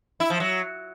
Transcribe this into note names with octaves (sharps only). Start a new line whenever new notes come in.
E4
F3
F#3